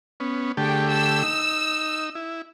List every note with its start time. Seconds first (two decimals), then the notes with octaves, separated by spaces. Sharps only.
0.20 B3 C#4
0.57 D3 A3 G4 G#4 G5
0.89 E6
1.23 D#4
2.15 E4